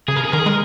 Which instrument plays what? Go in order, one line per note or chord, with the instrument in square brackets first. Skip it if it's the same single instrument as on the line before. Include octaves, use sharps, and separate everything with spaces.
[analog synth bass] C#3 [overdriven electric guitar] G#4
[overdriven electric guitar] A#4
G#4
[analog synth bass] D#3 [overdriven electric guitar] A#4
[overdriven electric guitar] G#4
[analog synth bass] G#3 [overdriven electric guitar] A#4